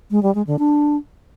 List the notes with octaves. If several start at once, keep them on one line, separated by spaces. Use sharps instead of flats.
G#3
G3
G#3
D3
D4